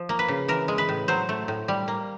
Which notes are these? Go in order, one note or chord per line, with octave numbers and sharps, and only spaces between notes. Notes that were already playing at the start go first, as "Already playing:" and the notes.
Already playing: F3
A#3
B4
C#3
E3 A#4
G#3
B4
A2
F#3 C5
A3
A2
G3
A#3